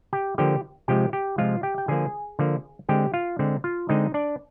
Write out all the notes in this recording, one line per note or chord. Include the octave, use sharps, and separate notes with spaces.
G4 G5
D3 F3 A#3 G4 G5
C3 F3 G#3 G4 G5
G4 G5
C3 F3 G#3 F4 F5
G4 G5
G5
D3 F3 A#3 G#4 G#5
D3 F3 A#3
D3 G#3 C4 G4 G5
F4 F5
D3 G#3 C4
F4 F5
D3 G#3 C4 D#4 D#5
D4 D5